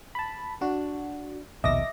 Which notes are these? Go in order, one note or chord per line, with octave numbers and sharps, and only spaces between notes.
A5 B5
D4 F#4
A#1 D#2 B2 D#5 E5 D6 A#6